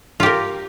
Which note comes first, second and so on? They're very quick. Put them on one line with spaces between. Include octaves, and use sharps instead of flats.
F4 G4 A#4